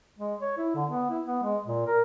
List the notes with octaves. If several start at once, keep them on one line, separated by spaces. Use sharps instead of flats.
G#3
C#5
E4
D3
B3
E4
B3
G#3
A#2
A#4